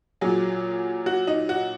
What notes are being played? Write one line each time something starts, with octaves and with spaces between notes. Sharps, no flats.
A#2 F#3 G#4
F#4
D#4
F#4